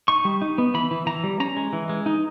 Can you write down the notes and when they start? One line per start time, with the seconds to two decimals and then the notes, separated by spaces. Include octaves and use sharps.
0.08 D#4 C#6
0.25 G3
0.42 D#4
0.58 B3
0.74 E3 B5
0.91 E3
1.07 E3 A#5
1.24 G3
1.40 C#4 A#5
1.57 G#3
1.73 E3
1.89 G#3
2.06 D#4